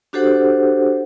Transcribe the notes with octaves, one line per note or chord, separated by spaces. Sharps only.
D4 F#4 G4 A4 C5 F#5